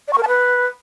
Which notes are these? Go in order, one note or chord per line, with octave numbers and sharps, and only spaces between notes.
D5
C#6
A#4
A5
B4